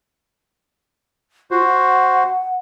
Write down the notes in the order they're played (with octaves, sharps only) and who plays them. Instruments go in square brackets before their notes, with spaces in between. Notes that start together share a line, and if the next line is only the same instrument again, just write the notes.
[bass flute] F4 [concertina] F#4 C5
[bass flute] F#5